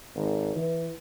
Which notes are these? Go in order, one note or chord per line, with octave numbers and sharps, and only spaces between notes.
G#1
E3